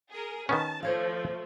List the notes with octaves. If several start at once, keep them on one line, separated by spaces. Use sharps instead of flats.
G#4 A#4
D#3 B3 C#4 A5
F3 A3 C5 C#5 F5